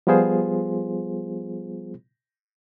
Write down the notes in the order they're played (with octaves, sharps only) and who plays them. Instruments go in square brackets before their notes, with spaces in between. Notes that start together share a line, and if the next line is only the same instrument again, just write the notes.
[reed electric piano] F3 G3 B3 F4 G#4 C5